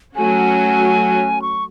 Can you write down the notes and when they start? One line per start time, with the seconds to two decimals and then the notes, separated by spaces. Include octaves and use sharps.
0.15 F#3 A3 C#4 F#4 G#5
1.42 C#6